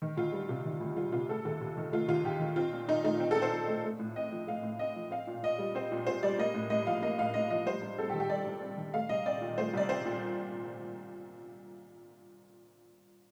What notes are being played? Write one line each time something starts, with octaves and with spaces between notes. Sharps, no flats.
D#3
D2 F4
G3
C3
D#3
D2
G3 F4
C3 F4
A3 A4
D#2 A4
D#2
D#3
A3 F4
D#2 F4
D#2 G4
D#3
C4 F4
A#2
A#2 D#4
A3 D#4
C4
A4
A#2
C5
A#2
A3
A3
A2
C4 D#5
F3
A3 F5
A2
C4 D#5
F3
C4 F5
A#2
A#2 D#5
G3
C4 C5
A#2
A#2 C5
G3 D5
A#3 D#5
A2
A2 D#5
F3 F5
A#3 D#5
A2 F5
A2 D#5
F3 D#5
G3 C5
G2
C4 A4
G4
D#3
G4
G3 D5
G2
C4
D#3
A3 F5
C2 D#5
C4 D5
A#2
A3 C5
C2 D5
C4 C5
A#2